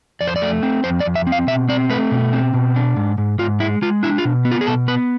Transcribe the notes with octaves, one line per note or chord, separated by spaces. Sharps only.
F2 D5
C5
D5
A3
C4
F2 C5
D5
F2
E5
C4
F5
B2 E5
C4 D5
A3 B4
B2
C4
B2
D4
G#2
G#2
G#2 F4
G#3 E4
G#3 F4
D4 E4
F4
B2
B3
F4
G#4
B2 A4
B3 B4